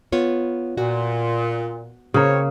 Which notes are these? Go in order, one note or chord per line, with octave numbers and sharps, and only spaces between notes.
B3 F4 C#5
A#2 F#4
C#3 A#3 C4 E4 C#5